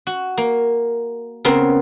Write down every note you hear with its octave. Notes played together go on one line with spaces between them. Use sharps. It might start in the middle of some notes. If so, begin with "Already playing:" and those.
F#4
A#3
C#3 B3 C4 A#4